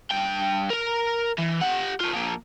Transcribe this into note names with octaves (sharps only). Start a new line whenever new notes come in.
G2 G5
A#4 A#5
E3
G4 F#5
A3 F4
F3 A#3